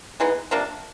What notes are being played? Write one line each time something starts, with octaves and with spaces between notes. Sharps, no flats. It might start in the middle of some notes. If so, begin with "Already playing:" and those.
E3 G#3 B3 D#4
C3 F3 A#3 D4